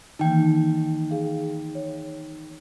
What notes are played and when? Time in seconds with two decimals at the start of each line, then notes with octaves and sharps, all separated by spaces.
0.19 D#3 E3 A#3 D#4 G5
1.11 G#4 F5
1.75 C#5